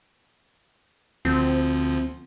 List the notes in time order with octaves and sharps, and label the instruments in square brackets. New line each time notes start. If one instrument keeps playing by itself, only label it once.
[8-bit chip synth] D2 F3 [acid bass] C4